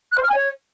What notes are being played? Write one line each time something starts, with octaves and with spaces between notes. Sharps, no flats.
F#6
C5
F6
G#5
C#5